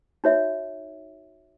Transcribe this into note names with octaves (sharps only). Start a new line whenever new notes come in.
D#4 F#4 C#5 E5